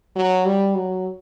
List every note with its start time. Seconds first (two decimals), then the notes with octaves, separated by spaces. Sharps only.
0.16 F#3
0.45 G3
0.75 F#3